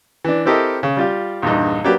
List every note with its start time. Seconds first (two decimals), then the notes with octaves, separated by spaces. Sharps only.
0.25 E3 D4
0.46 C4 E4 G4 A4 A#4 D#5
0.83 C#3
0.97 G3 F4 G4
1.42 A#1 E2 G2 D#4
1.84 F#3 A#3 D4 G4 B4